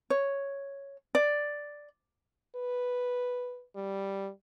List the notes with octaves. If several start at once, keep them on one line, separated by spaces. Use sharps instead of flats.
C#5
D5
B4
G3